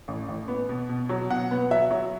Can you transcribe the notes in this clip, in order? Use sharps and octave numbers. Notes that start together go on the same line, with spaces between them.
A1
A1
B3
B2
B2
F#3
B2 F#5
B3
F#3 E5
F#3